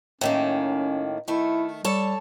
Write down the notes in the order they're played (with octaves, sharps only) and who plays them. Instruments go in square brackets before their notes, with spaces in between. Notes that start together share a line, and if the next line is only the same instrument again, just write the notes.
[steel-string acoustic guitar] A2 D#3 A#3 [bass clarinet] C#4
[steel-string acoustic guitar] D#3 A3 [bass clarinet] E4
[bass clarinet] G3 [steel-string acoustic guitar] A4 C#5 A5